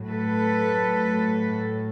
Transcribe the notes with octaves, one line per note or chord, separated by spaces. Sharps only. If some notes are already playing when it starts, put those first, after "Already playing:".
Already playing: A2 F#3
A4 B4